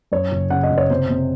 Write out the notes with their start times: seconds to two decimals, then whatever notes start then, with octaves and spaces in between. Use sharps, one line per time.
0.12 F#2 C#5
0.32 F#1
0.50 C#3 F#5
0.63 D#5
0.70 F#1
0.78 C#5
0.90 C3 C5
1.09 C3